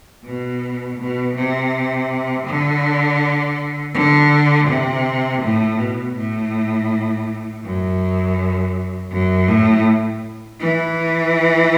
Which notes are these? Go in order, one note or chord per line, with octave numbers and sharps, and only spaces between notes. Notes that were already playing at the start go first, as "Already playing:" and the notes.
B2
B2
C3
D3
D3
C3
A2
B2
A2
F#2
F#2
A2
E3